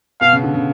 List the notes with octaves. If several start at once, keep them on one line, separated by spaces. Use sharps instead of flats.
B2 F5
C#3
D3
C#3